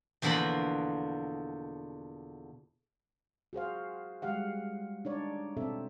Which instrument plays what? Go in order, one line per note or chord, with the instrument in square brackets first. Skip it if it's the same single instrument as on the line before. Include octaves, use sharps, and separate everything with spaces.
[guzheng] E2 B2 D3 F3 A#3 B5
[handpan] F#4 G#4 C5 F5
G3 G#3 G4 F5 F#5
D4 D#4 C#5 D5
B2 C4 A4 E5